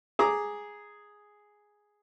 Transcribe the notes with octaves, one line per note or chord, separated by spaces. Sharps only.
G#4 A#5 D6